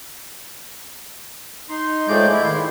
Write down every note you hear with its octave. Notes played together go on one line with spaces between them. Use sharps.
D#4 C6
A2 F3 G#3 A3 D5 G6
E4
D#3 C6